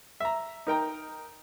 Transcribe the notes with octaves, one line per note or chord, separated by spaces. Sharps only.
E5 A#5
D#4 A#4 G5 A#5